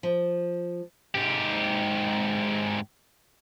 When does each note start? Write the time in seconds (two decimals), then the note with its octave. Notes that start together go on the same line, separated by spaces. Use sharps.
0.03 F3
1.15 G#2 G4